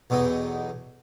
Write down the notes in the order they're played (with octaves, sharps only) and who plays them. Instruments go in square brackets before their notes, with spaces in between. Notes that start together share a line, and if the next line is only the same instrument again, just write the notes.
[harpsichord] B1 E2 B2 D#4